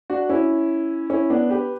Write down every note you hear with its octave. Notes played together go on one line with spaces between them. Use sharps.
D4 F#4
C#4 E4
C#4 E4
B3 D4
G4 B4